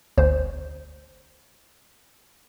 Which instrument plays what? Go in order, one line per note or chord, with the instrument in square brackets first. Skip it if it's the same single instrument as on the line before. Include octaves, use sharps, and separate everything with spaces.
[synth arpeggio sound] G1 D2 C5